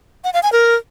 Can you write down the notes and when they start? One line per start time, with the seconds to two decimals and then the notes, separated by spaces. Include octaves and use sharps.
0.24 F#5
0.34 F5
0.43 G#5
0.52 A#4